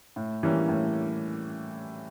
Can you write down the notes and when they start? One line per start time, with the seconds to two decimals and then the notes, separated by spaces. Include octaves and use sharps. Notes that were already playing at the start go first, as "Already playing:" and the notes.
0.16 A2
0.43 E3 G3 A#3 C#4
0.69 A2